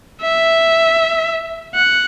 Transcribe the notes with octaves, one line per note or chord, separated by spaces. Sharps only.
E5
F#5